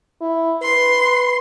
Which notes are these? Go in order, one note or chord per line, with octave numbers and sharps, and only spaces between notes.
E4
B4 C6